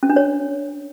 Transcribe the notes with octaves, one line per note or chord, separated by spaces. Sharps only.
C#4
D4
C#5